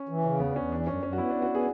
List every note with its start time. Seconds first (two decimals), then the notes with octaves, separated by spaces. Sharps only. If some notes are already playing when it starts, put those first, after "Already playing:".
Already playing: C#4
0.09 E3
0.24 C#3 C#4
0.40 E2 B3
0.51 D4
0.55 E2 C#4
0.72 E3 D4
0.87 F#2 C#4
1.03 F#2 C#4
1.13 F#4
1.18 B3 E4
1.30 B3 D4
1.42 F#4
1.50 B3 G#4